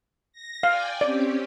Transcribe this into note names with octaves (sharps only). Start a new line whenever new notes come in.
A#6
D5 F5 G5 G#5
C4 C#4 G4 D5